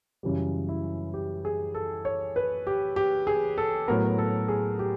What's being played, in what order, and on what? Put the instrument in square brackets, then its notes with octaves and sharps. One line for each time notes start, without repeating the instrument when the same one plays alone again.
[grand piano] F#2 C#3 E3 G3
E4
G4
G#4
A4
C#5
B4
G4
G4
G#4
A4
A2 F#3 B3 A#4
A4
G#4
G4